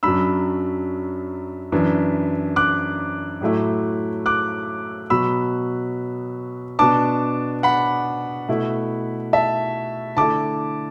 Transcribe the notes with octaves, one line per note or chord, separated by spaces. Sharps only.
F#2 F#3 D4 B5 E6
F#2 E3 D4
D6 F#6
A2 F#3 A3 E4
D6 F#6
B2 F#3 B3 B5 E6
B2 B3 D4 A5 D6
F#5 B5
B2 A3 E4
E5 A5
D3 A3 E4 A5 D6